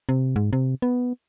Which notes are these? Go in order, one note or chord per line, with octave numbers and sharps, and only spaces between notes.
C3
G#2
C3
B3